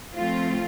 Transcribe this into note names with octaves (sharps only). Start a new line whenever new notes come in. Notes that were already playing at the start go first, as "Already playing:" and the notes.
F3 A3 C4 F4